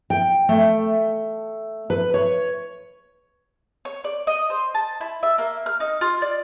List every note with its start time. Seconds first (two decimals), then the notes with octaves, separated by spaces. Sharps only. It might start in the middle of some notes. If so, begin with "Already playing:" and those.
0.10 G5
0.49 A3
1.90 B4
2.14 C#5
3.85 C#5
4.04 D5
4.27 D#5
4.50 C5
4.75 A5
5.01 E4
5.23 E5
5.38 A#3
5.66 F6
5.80 D#4
6.01 F4
6.22 D5